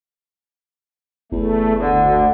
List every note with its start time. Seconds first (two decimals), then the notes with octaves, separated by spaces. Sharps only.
1.32 F#1 E2 A3
1.81 D2 D3